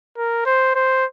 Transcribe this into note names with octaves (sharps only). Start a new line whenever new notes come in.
A#4
C5
C5